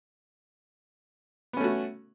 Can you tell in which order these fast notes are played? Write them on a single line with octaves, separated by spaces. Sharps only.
B3 C#4 A3 F#4